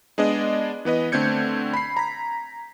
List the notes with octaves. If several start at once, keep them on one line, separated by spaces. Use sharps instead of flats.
G#3 B3 D4 G#4 D5 D#5
E3 B3 B4 D#5
D3 A3 C4 G6 G#6 C#7
B5 C7
A#5 B6